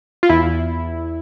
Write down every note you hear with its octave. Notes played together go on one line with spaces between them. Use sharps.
F4
E2 E4